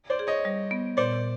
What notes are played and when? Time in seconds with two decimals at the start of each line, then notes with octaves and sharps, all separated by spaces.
0.10 C5 D5
0.19 G#4
0.27 C#5 D#5
0.45 G3
0.71 B3
0.97 A#2 C5 D5